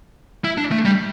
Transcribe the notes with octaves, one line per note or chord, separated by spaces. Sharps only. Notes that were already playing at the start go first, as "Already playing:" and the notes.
E4
D4
A3
G3